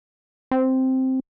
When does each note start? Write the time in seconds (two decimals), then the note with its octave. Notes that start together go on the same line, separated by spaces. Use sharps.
0.51 C4